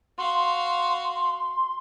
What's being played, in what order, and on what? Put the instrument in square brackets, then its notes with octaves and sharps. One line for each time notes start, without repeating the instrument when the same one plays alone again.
[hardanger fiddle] F#4 F5 [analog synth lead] C6